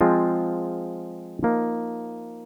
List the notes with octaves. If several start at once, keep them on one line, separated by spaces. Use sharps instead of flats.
F3 G#3 C4 F4
F3 A#3 D#4